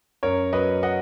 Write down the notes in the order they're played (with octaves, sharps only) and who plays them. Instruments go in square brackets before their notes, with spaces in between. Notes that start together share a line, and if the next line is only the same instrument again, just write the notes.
[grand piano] F#2 A#4 C#5
F#3 B4 D#5
F#3 D#5 F#5